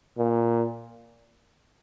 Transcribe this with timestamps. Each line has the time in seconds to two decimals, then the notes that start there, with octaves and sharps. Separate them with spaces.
0.18 A#2